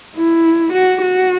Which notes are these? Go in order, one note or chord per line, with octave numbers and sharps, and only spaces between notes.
E4
F#4
F#4